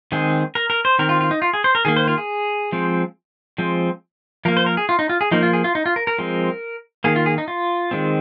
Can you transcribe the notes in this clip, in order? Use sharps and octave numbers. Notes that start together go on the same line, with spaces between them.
D#3 G#3 C4 G#4
A#4
A#4
C5
D#3 C4 A#4
F4
F4
D#4
F4
G#4
C5
A#4
D#3 A#3 G#4
C5
F4
G#4
F3 G#3 C4
F3 G#3 C4
F3 A#3 A#4
C5
A#4
G#4
F4
D#4
F4
G#4
F3 A#3 D#4
F4
G#4
F4
D#4
F4
A#4
A#4
F3 G#3 C4
D#3 A#3 G#4
F4
G#4
D#4
F4
D#3 G#3 C4